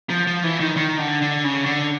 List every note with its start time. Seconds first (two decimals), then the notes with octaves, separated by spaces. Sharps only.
0.10 F3
0.27 F3
0.43 E3
0.60 D#3
0.77 D#3
0.99 D3
1.22 D3
1.44 C#3
1.66 D3